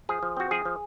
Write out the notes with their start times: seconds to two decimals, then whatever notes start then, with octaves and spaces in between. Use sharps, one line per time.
0.09 F3 G#4
0.23 F3
0.37 C4 F#4
0.51 F3 G#4
0.65 F3